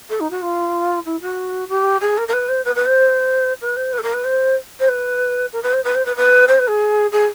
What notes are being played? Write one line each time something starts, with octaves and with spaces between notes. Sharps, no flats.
A4
D#4
F#4
F4
E4
F#4
G4
G#4
A#4
A#4
B4
C5
B4
B4
C5
B4
C5
B4
A4
A#4
B4
C5
C5
B4
A#4
B4
C5
B4
C5
B4
B4
C5
B4
G#4
G#4